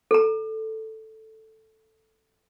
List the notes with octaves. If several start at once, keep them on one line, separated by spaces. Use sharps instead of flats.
A4 A#5